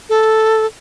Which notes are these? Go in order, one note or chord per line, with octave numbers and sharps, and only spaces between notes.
A4